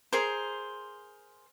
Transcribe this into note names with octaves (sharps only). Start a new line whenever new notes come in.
G#4 A#4 C5